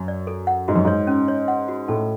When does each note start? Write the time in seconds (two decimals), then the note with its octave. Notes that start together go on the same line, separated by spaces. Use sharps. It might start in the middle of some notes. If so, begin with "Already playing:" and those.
Already playing: F#2
0.08 D5
0.27 A4
0.47 F#5
0.68 G#2 F#4
0.76 F#2
0.85 G#2 C#5
1.07 C#4
1.28 C#5
1.48 F#5
1.68 F#4
1.88 A2 A5